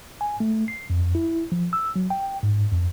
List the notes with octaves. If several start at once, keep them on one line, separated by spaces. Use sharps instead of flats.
G#5
A3
C7
F2
E4
F3
E6
F#3
G5
G#2
F2